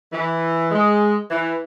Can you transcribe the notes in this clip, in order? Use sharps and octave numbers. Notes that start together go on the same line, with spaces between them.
E3
G#3
E3